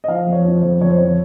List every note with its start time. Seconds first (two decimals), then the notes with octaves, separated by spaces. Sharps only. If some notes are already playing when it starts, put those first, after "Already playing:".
0.04 D#5
0.08 F3 F5
0.27 F2
0.32 C#5
0.45 F3
0.57 C5
0.63 F2
0.81 F2 C#5
0.89 C5
0.98 F3 C#5